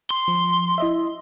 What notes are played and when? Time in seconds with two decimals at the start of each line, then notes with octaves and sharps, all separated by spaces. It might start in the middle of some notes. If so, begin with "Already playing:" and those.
0.11 C6
0.28 F3
0.78 E4 D#5 E5